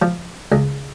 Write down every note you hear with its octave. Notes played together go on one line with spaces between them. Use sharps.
F3
C#2